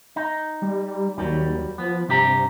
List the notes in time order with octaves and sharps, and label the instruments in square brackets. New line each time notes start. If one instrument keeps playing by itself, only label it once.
[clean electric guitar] D#4
[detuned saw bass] G3
[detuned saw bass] D#2 [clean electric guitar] F#3 G3
[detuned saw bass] F3 [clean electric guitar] B3
[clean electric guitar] G2 G4 A#5 [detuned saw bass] C3